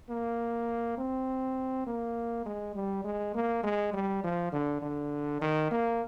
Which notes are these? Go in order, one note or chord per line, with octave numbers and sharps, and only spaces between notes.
A#3
C4
A#3
G#3
G3
G#3
A#3
G#3
G3
F3
D3
D3
D#3
A#3